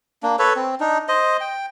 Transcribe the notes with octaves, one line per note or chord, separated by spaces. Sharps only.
A#3 D4
A4 B4 C#5
C4
D4 D#4
C5 D#5
G5